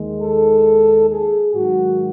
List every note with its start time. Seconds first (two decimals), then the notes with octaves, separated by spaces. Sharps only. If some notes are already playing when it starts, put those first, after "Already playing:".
Already playing: D#2 D#3 G#3
0.21 A4
1.09 G#4
1.54 G#2 D#3 F#3 F#4